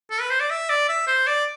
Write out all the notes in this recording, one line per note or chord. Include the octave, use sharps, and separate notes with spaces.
A4
B4
C5
D5
E5
D5
E5
C5
D5